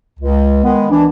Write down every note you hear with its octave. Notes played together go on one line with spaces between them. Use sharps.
C#2
D#3 G#3 B3
E3 D4